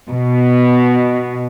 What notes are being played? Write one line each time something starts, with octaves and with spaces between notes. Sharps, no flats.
B2